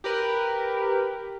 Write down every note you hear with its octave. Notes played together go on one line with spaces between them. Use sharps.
G4 A#4 B4